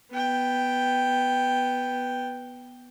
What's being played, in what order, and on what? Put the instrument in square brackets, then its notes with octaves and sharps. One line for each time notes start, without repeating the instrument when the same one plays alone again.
[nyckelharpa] B3 G5